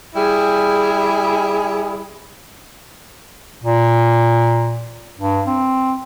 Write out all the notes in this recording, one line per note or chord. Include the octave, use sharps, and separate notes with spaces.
G3 E4 G#4
A#2
G2
C4